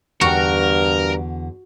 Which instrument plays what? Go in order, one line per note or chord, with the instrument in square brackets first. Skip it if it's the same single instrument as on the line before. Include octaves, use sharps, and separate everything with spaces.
[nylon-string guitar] E2 D3 G5 [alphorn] G2 [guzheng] F#4 [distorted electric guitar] A#4